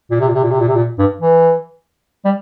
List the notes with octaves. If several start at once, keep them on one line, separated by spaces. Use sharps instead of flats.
A#2
C3
A#2
C3
A#2
C3
A#2
C3
A#2
G2
E3
G3